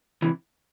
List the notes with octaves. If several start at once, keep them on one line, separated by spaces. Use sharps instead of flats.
C3 E3